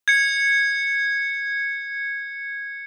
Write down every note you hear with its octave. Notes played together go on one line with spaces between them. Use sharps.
G#6 C#7